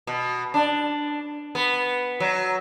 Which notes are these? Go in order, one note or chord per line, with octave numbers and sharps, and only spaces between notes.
B2
D4
B3
F#3